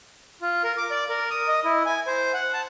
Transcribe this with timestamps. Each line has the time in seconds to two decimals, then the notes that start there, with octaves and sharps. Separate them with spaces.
0.42 F4
0.64 A#4
0.77 D6
0.91 D5
1.09 A#4
1.30 D#6
1.48 D#5
1.64 E4
1.86 G#5
2.07 C5
2.34 F#5
2.53 A5